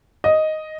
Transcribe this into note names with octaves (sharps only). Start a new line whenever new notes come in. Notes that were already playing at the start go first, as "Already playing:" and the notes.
D#5